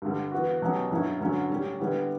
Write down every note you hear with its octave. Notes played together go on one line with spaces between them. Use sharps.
G2 D3 G3
E3 B3 F#4
B2 F#3 C#4 G4
G2 F#3 C#4 E4
G2 D3 F#3 C#4 F#4
A2 G3 C#4 G4
D3 G3 B3 E4 G4